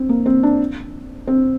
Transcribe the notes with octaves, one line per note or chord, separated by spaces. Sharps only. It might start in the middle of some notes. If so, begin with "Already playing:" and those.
Already playing: C4
A#3
C4
D4
C4